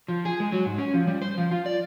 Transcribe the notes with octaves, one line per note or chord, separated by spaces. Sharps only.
F3
G#4
G#3
F#3
G#2
C#4
F3
G3
C5
F3
F4
D5